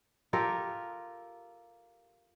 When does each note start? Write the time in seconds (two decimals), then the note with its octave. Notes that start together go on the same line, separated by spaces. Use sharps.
0.33 F4 G4 A4 A#4